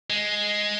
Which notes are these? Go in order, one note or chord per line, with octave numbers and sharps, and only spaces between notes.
G#3